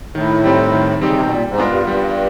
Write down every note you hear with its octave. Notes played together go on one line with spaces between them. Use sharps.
A2 D#3
G3 C4 D#4 G4
D#3
C#3 G3 C4 D#4 G4
C3
B2
A#2 G3
G#2
B3 D4 F4 A#4
G2
G2 G3